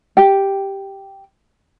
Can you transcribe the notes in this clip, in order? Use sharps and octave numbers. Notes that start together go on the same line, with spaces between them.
G4 G5